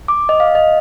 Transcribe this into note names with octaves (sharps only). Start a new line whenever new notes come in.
D6
D#5
F5
D#5